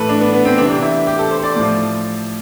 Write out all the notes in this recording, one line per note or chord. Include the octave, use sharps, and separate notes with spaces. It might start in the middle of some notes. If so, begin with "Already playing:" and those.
Already playing: A2 E3 A4 B4
D4
B3
B3
C4
C3 E3 D4
E4
G4
A4
C5
D5
A2 F3